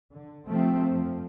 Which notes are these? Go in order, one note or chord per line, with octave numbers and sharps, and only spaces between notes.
D3
C3 F3 A3 C4
F2 F3